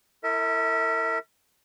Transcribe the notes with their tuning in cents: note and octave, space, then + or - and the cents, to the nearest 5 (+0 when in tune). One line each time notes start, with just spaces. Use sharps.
E4 +0 A#4 -45 E5 -30